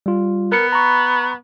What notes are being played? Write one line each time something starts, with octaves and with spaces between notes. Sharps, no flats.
G3 F4
B3 A#4 C#7
A#5 B5 C#6